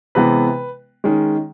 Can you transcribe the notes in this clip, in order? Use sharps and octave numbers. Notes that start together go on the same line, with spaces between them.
C3 E3 G#3 B3 B4
D#3 G#3 C#4